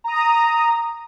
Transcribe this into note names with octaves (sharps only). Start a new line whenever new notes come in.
A#5 D#6